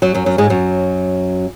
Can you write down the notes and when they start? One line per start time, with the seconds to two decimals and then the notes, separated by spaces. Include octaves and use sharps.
0.02 F#2 F#3
0.14 F#2 F#3
0.26 F#2 F#3
0.38 G#2 G#3
0.50 F#2 F#3